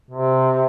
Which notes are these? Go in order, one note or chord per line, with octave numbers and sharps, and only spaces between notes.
C3